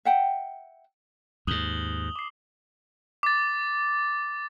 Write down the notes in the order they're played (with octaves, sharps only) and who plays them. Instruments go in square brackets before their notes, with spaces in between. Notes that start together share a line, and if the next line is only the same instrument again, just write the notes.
[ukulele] E5 F#5 G5
[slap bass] D#2 G#2 [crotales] D#6 F#7 G7
[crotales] D6 C7
D6 A6